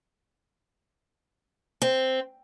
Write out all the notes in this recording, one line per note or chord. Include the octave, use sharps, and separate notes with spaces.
C4